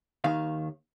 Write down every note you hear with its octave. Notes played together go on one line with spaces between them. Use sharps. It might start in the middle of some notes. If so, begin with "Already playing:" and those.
D#2 D#3 F5